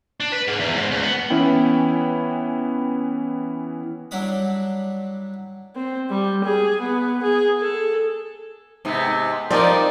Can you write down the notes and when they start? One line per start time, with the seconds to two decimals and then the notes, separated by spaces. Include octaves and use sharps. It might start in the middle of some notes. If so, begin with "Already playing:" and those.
0.20 D4
0.32 B4
0.48 G#2
0.60 E2
0.76 G#2
0.91 C#2
1.03 B3
1.30 E3 B3 C#4 E4 G5
4.11 F#3 G3 D4 E4 B5 D#6
5.76 C4
6.10 G3
6.44 G#4
6.81 B3
7.23 G#4
7.61 A4
8.85 G#2 C3 B3
9.50 F3 C4 D#4 A#4 D5